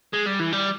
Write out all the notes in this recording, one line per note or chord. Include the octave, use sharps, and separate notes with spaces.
G#3
G3
E3
G3